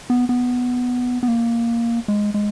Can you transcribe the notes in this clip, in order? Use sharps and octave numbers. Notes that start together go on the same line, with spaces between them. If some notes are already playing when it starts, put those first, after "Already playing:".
B3
B3
B3
A#3
G#3
G#3